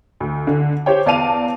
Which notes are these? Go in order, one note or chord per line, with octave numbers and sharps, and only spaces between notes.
D2
D3
G4 C5 C#5 G5
E2 D5 F5 A5 D#7 F7